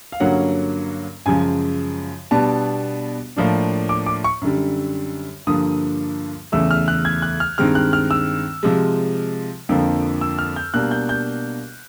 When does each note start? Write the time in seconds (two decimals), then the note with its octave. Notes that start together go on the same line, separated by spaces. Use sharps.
0.12 F5
0.20 G2 D3 F#3 A#3 C#4 F#5
1.26 F#2 C#3 F3 G#3 G#5
2.31 B2 G3 B3 D4 A5
3.36 A2 F3 A#3 D4
3.89 D6
4.06 D6
4.24 C#6
4.42 F#2 D3 G3
5.47 G2 D3 F3 A#3 D#6
6.52 E2 C#3 E3 A3 E6
6.71 F6
6.88 F#6
7.05 G#6
7.22 F#6
7.40 F6
7.58 G2 D#3 G#3 C4 F6
7.75 F#6
7.93 F6
8.11 E6
8.63 C3 F3 G#3
9.69 F2 D3 F3 A#3
10.21 E6
10.39 F6
10.56 G6
10.74 B2 G3 A#3 D4 F#6
10.91 G6
11.09 G6